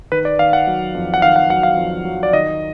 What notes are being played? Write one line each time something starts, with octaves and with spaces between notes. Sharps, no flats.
D#3 B4
D5
D#3 F5
F#5
F#3
F2
F#5
D#3 F5
F#5
F#3 F#5
F5
F2
F#3
D5
D#3 D#5